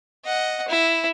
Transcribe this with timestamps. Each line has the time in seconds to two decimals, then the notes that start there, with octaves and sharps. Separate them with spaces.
0.24 D#5 F#5
0.68 E4